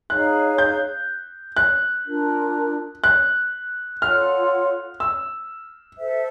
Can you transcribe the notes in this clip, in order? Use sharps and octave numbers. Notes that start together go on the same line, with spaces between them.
D#4 G#4 C#5 F5 F#6
G6
F#6
D4 F4 A#4
F#6
F4 A4 C#5 F#5 F6
E6
A4 C5 E5